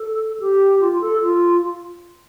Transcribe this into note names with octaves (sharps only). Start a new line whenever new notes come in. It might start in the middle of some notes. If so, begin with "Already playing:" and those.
Already playing: A4
G4
F4
A4
F4